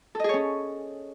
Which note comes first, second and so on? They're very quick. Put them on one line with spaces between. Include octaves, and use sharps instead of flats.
A4 D#5 G#4 C#5 C#4